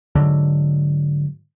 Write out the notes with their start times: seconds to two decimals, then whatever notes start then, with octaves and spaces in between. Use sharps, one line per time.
0.15 G#2 D3 F#3